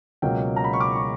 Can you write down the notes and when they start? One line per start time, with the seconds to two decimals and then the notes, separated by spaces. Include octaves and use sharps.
0.22 C#2 B2 F#3 A#3 G5
0.56 A#5
0.64 B5
0.73 C#6
0.80 D6
0.96 C#6